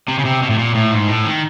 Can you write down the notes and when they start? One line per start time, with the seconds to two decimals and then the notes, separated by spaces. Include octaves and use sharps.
0.08 C3
0.18 C#3
0.24 C3
0.42 B2
0.50 A2
0.58 A#2
0.74 A2
0.91 G#2
1.08 A2
1.25 D#3